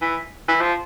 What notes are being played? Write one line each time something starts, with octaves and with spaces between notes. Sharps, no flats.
E3
E3
F3